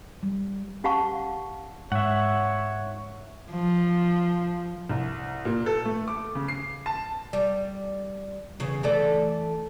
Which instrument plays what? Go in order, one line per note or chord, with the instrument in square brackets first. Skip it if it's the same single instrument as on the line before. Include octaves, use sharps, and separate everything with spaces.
[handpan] G3
[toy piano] C#4 G4 F5 F#5 A5 C#6
[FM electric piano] G#2 [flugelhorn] C#5 [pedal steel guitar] E5 F#5
[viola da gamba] F3
[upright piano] C2
A#2
A4
A3
D6
C#3
C7
A5
[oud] G3
E2 C#3
E3 A3 D5